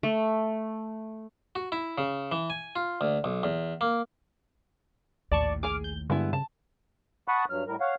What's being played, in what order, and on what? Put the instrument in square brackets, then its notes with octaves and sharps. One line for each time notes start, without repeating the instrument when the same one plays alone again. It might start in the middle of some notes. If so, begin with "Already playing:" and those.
[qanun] A3
[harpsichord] F#4
E4
C#3
E3
G#5
F4
D2
B1
E2
A#3
[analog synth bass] A#1 [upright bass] D#2 A2 [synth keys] D5 A5 C#6
[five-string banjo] G#4 G#5 [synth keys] D6 F6
[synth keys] G6
[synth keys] G2 [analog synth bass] D3 [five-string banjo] G#3 B3 E4
[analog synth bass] C#3 [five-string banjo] A5
[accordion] F#5 A5 B5 C#6 D#6 F#6
G2 F#3 F6
A2 G3 A#4
C#5 F5 F#5